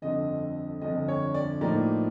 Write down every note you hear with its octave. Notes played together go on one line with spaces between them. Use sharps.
G1 F2 D3 D#5
G1 F2 D3 D#5
C#5
D5
A2 F3 A#3 D#4 D5